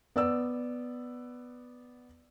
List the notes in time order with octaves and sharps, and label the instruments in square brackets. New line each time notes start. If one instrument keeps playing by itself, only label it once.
[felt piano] B3 D5 E6